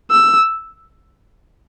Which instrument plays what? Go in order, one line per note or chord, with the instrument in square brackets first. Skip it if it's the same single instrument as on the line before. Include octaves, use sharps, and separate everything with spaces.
[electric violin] E6